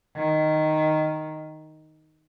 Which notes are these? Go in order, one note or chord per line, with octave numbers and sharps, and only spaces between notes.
D#3